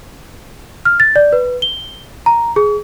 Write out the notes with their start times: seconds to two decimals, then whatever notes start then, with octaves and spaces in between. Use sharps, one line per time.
0.85 F6
1.00 A6
1.16 D5
1.33 B4
1.62 G7
2.26 A#5
2.56 G#4